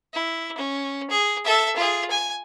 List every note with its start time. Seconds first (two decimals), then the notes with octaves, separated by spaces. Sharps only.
0.13 E4
0.57 C#4
1.10 G#4
1.45 A4 E5
1.76 F4 G#4
2.10 G#5